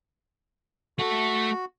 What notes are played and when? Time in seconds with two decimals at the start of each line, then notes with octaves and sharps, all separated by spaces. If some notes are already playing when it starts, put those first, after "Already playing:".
0.99 A3 F#4 A4